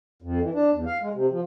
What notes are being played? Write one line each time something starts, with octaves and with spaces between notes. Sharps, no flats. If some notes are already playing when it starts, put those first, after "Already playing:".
F2
E3
D4
E2
F5
G#3
C3
F3